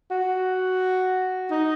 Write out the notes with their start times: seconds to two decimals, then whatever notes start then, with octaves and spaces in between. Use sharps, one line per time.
0.11 F#4
1.51 D#4